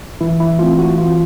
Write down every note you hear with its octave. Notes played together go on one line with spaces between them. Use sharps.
E3 E4
E4
A3 C4 F4
F#4
E3 F4